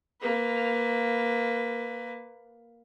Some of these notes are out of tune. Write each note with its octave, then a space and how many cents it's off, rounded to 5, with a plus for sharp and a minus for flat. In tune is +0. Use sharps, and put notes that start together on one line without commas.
A#3 +0 B4 +15